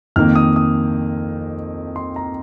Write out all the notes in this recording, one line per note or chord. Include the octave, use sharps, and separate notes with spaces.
F2 D#3 A#3 D#4 F6
D#6
D#6
C6
A#5